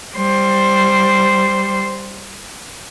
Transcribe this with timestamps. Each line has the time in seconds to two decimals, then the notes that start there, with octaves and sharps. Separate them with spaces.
0.15 G3 C5